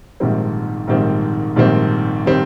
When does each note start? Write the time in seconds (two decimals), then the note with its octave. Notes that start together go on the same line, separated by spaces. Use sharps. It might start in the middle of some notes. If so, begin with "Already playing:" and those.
0.20 A#1 G#2 D#3 G3 C4
0.87 A#1 G#2 D#3 G3 C4
1.56 A#1 G#2 D#3 G3 C4
2.26 D#3 G3 C4